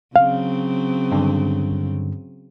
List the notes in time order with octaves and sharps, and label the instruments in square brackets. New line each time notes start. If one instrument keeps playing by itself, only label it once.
[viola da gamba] C#3 F#3 C4 [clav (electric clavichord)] F5
[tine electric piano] G2 D3